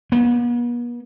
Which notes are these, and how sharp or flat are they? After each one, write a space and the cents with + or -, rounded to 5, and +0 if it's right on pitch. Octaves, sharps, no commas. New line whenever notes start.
B3 -45